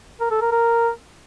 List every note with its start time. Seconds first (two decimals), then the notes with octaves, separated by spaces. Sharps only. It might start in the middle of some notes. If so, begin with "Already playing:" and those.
0.21 A#4
0.31 A4
0.41 A#4
0.52 A#4